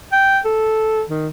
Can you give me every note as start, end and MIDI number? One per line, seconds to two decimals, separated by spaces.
0.12 0.39 79
0.45 1.02 69
1.09 1.28 51